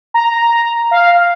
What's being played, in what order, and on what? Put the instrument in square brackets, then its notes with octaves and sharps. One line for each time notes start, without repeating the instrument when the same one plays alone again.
[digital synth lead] A#5
F5